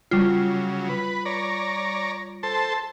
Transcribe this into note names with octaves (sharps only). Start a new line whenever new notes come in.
C#3 F#3 G3 F4
B4
C#5 D5 A#5
A4 C5 A5